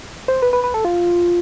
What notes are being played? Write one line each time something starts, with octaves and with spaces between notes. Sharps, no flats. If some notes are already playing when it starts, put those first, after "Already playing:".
C5
B4
B4
B4
A4
F4